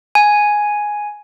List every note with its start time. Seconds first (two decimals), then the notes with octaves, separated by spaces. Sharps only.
0.15 G#5